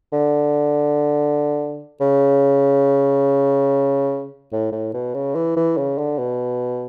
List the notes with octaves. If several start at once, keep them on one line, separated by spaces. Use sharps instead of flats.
D3
C#3
A2
A2
B2
C#3
E3
E3
C#3
D3
B2